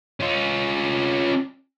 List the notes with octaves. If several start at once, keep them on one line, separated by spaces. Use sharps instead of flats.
C#4 F4